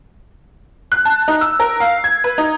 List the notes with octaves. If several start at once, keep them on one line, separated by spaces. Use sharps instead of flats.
F#6
A5
D#4
E6
A#4
F5
G#6
B4
D#4